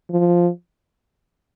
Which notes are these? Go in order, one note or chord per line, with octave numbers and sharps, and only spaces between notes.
F3